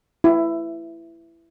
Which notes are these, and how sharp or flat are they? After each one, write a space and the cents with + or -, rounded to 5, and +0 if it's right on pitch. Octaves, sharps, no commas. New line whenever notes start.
E4 +15